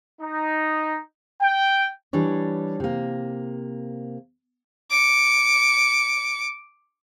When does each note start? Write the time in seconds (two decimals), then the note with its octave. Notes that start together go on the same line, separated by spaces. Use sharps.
0.21 D#4
1.42 G5
2.13 E3 G3 D4 C#5
2.80 C3 A#3
4.90 D6 C#7